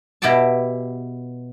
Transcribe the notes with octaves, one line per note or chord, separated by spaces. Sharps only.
B2 E4 G4 G5 A5